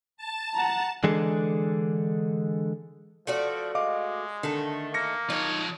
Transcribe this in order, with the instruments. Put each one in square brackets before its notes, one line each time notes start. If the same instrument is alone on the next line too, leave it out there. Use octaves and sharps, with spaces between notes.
[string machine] A5
[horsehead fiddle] F#5 A#5
[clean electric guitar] D3 E3 G#3 D4 G#4 A4
[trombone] F3 [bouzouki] A3 F#4 D5
[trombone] G#3 [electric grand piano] D#5 F5 D6
[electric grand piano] D3 [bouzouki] D#3 A3
[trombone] A#3 [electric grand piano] A#6 C#7
[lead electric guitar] F3 C#5 [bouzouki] D#4